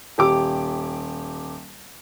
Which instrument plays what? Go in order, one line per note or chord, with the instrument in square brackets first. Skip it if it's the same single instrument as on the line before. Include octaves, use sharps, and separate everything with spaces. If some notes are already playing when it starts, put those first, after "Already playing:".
[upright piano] D#1 G4 D6